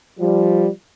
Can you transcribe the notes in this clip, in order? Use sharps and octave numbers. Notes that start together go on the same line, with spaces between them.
F3 G3